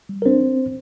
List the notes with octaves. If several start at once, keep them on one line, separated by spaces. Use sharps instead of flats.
G3
A#4
C4 D4 C5